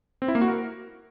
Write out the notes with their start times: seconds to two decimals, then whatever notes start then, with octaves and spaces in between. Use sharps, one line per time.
0.22 C4
0.28 E4
0.35 A#3
0.42 F#4
0.48 A#4